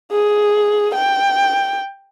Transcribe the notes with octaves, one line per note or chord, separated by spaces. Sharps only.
G#4
G5